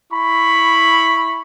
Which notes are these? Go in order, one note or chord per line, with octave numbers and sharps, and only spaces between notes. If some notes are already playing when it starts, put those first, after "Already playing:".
E4 B5 C#6